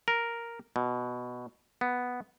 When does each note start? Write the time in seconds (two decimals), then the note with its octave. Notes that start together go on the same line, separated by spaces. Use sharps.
0.08 A#4
0.76 B2
1.81 B3